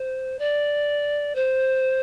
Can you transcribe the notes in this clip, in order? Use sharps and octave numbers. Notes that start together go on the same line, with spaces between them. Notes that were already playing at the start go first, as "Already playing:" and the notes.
Already playing: C5
D5
C5